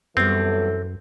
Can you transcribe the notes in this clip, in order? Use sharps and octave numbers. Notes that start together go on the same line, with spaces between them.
F#2 E3 F#3 G3 B3 C4 A4